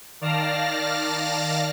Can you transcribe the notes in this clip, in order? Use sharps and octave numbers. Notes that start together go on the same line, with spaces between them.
D#3 D5 F5 A5 F6 A#6